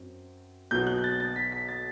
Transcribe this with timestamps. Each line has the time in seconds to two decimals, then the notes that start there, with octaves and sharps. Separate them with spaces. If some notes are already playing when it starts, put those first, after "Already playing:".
Already playing: F#2 F#3 C4
0.71 B1 B2 F#3 B3 G6
0.87 F#6
0.98 G6
1.04 A6
1.20 A6
1.36 B6
1.52 B6
1.69 A6